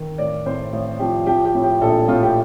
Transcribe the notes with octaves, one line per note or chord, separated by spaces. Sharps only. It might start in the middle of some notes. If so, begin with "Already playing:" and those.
Already playing: D#3
A1 D5
A2 C5
A1
F3 G4
F3 G4
G4
A2
G4
A#1 A4
A2 F4
G4